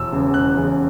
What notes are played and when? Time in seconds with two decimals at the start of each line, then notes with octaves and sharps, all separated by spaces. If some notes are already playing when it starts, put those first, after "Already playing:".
Already playing: E1 E6
0.12 E2 C#3
0.34 E1 F#6
0.57 E2 C#3